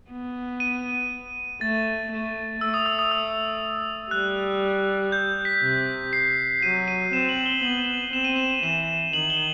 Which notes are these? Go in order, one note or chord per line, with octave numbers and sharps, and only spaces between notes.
B3
D#7
A3 A6
A3
A3 E6
D#6
E6
D#6
E6
G3 F#6
G6
B6
C3
C7
F#3 D#7
D#7
C4 E7
F#7
G7
B3 F#7
C4 E7
D#7
E7
E3 E7
D#3 F#7
G7